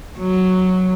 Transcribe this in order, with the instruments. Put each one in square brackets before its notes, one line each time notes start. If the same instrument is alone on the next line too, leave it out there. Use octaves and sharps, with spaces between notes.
[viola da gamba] F#3